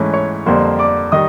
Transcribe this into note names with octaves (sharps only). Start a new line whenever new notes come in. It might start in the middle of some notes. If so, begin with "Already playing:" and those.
Already playing: G#2 E3 A3 C#4
C#5 C#6
F2 D3 G3 A#3 C5 C6
D5 D6
D#3 G3 D#5 D#6